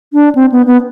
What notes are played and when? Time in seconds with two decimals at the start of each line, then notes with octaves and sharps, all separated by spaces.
0.13 D4
0.35 C4
0.52 B3
0.66 B3